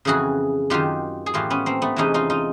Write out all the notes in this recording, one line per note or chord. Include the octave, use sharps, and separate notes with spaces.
F2 C#3 E3 F#4 G#4
F#2 D#3 F4 G4
G#4
A2 E3 F4 G4
B3 C#4
A#3 C4
A3 B3
E2 C3 E3 C#4 D#4
D#4 F4
D#4 F4